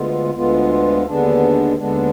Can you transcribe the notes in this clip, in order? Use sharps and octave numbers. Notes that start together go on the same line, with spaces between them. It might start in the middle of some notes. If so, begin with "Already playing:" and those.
Already playing: D2 D3 G#3 B3 F4
D2 D3 G#3 B3 F4
D#2 D3 G#3 B3 D4
D#2 D3 G#3 B3 D4